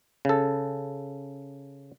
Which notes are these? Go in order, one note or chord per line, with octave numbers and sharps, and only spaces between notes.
C#3 A4